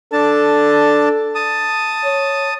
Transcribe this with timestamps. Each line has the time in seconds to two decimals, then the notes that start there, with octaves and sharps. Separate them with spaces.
0.13 D4 A4 A5
1.35 A5 D#6
2.04 C#5